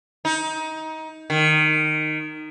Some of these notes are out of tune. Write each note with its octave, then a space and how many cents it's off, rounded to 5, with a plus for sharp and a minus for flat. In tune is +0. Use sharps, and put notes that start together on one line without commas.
D#4 +25
D#3 -15